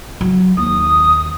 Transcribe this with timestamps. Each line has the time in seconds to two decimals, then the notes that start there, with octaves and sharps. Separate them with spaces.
0.21 F#3
0.57 D#2 D#6